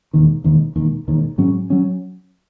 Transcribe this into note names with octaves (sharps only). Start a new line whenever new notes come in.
E1 D#2 D#3
E1 D#2 D#3
E1 D#2 D#3
E1 D#2 D#3
G#2 F#3 C#4
F#3 C#4